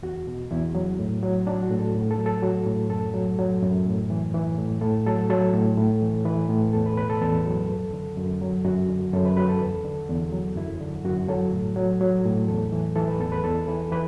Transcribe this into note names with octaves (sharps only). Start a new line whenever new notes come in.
E2 F#4
B2
E2 E4
F#3
A2
F#3
F#3 D4
F#4
A2
A4
A2
A4
F#3
A4
F#3 F#4
A2
F#2 A4
F#3
F#3
F#2
A2
E3
E3
A2
A2 A4
F#3 A4
F#3 A4
A2
A2
E3
E3 B4
A2
E2 A4
B4
B2 B4
A4
E2 A4
F#3
F#2
D3
F#2
F#3
F#2 F#4
D3
F#2 A4
B4
F#3 B4
A4
E2
D3
E2
F#3
F#2 E4
D3
F#2 F#4
F#3 A4
A2
F#3
F#3
A2
E2 A4
E3
E3 A4
B4
E2 A4
B4
E2 A4
E3 B4
E3 B4